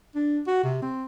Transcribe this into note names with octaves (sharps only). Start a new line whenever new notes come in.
D4
F#4
C3
C4